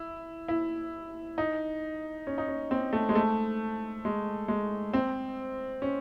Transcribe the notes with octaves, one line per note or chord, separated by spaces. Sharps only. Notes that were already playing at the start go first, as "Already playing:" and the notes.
Already playing: E4
E4
D#4
C#4
D#4
C#4
C4
A3
G#3
A3
G#3
G#3
C4
C#4